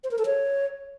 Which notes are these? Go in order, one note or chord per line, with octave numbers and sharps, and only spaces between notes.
C5
A#4
A4
C#5